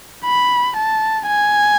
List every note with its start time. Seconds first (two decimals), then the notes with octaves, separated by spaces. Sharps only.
0.25 B5
0.77 A5
1.28 G#5